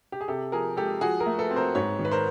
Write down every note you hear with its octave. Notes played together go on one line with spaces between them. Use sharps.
G4
G#4
C3 G4 A4
F3 G#4 A#4
G#3 G4 A4
F3 F#4 G#4
G#4 A#4
A3
A4 B4
C4
A#4 C5
G#2 B4 C#5
D#3
B4
A#4 C5